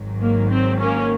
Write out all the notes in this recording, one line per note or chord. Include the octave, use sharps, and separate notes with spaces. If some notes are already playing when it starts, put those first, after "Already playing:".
Already playing: G#1 G#2 D#3 F#3
A#3
C4
A#3 C#4